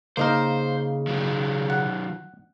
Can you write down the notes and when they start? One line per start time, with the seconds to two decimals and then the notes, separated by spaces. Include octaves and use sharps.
0.17 C#3 A#3 D#4 A#4 C5
1.07 D#3 F#3
1.70 F#5